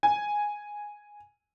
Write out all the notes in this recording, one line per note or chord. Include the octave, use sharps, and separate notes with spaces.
G#5